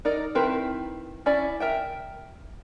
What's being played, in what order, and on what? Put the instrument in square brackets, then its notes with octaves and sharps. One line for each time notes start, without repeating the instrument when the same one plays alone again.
[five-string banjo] D#4 A#4 D5
D#3 C4 E4 A#4 B4
C#4 E4 D5
A#4 E5 G5